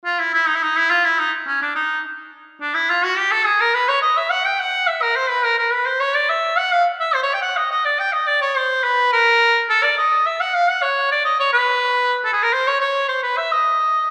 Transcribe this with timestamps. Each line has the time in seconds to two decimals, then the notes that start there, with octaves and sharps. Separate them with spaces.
0.05 F4
0.19 E4
0.34 E4
0.47 D#4
0.55 E4
0.63 D#4
0.77 E4
0.90 F4
1.05 E4
1.19 D#4
1.47 C#4
1.62 D4
1.75 D#4
2.61 D4
2.74 E4
2.89 F4
3.03 F#4
3.17 G4
3.31 A4
3.45 G#4
3.60 A#4
3.74 B4
3.89 C#5
4.02 D#5
4.17 E5
4.30 F#5
4.45 G5
4.60 F#5
4.87 E5
5.02 A#4
5.16 C5
5.29 B4
5.44 A#4
5.59 A#4
5.72 B4
5.86 C5
6.00 C#5
6.14 D5
6.29 E5
6.57 F#5
6.72 F5
7.00 E5
7.14 C5
7.23 C#5
7.33 G5
7.42 F#5
7.57 D#5
7.71 D#5
7.85 D5
8.00 G5
8.13 D#5
8.27 D5
8.41 C#5
8.56 C5
8.83 B4
9.13 A#4
9.69 A4
9.83 D5
9.98 D#5
10.26 E5
10.40 F#5
10.54 F5
10.69 F#5
10.82 C#5
11.11 D5
11.25 D#5
11.40 C#5
11.53 B4
12.25 A4
12.33 G#4
12.43 A#4
12.53 C5
12.67 C#5
12.80 C#5
13.08 C5
13.23 B4
13.37 E5
13.52 D#5